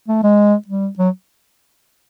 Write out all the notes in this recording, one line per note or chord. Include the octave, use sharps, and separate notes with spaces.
A3
G#3
G3
F#3